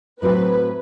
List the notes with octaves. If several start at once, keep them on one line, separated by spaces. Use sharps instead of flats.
A2 F#3 C4 F#4 B4 C5